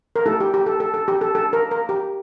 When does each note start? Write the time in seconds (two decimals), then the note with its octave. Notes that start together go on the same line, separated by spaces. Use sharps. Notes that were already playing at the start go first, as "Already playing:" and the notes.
0.16 A#4
0.26 A3 E4 G4 A4
0.40 G4
0.54 G4
0.66 A4
0.80 A4
0.94 A4
1.08 G4
1.21 A4
1.35 A4
1.53 A#4
1.71 A#4
1.89 G4